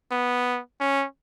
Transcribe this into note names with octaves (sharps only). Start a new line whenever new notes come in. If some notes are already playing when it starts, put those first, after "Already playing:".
B3
C#4